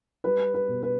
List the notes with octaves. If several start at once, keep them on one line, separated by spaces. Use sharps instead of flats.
G3 B4
B4
B2
B4